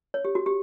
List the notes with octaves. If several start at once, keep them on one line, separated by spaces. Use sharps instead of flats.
C#5
G4
F#4
G4